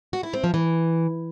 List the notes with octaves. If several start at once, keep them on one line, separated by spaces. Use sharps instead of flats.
F#4
E4
C4
F3
E3